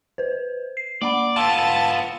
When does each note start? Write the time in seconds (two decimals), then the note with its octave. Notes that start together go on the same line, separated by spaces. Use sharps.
0.18 B4 C5
0.77 C7
1.02 A#3 D5 F#5 B5
1.36 B3 F4 G5 A5 C6 E6